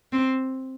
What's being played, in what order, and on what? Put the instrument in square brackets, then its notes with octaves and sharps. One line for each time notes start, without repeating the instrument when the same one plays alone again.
[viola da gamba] C4